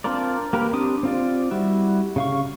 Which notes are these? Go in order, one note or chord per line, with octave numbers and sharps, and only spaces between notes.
C4 D4 F4 A#4 D5
A#3 G4 A#4 B4
C4 D4 G4 D6 D#6
C4 F4 D5
G3 E4 F#4
C#3 F5 C#6